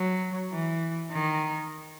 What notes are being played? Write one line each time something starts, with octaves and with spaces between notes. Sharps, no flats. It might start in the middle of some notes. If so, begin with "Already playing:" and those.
Already playing: F#3
E3
D#3